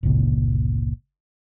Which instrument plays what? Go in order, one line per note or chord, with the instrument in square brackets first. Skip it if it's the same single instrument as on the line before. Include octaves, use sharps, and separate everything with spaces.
[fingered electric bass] G1 C#2 A#2 C#3